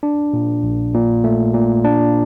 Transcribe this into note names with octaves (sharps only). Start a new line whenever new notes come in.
D4
A#2
A#1
A#2
A3
A#2
D4